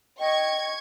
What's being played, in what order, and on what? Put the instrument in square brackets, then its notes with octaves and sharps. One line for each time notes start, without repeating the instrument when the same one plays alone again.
[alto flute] D#5 [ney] G5 [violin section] C#6 G#6